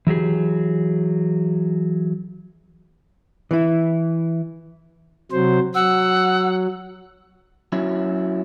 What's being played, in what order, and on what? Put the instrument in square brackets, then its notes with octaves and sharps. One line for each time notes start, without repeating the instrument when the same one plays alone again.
[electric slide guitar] E3 F#3 G4 G#4
[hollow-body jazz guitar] E3 E4
[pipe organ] C3 F#3 C5
[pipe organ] F#3 [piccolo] F#5 [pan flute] E6
[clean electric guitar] F#3 C#4 E4